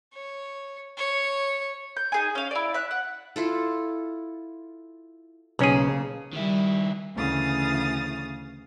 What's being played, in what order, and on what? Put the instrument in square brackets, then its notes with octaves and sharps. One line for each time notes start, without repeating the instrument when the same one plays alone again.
[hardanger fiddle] C#5
C#5
[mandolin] G6
D#4 G#4 G#5
C#4 F5
E4 D5
E5 F#6
F#5
[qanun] E4 F4 A4
[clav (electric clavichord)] B1 C#4 G#4 [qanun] C#3 A#3
[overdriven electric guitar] D#3 E4 [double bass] G3
[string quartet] D2 C#3 E3 F5 D#6 A6